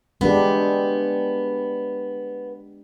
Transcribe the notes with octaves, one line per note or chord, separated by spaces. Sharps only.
G#3 B3 D4 G4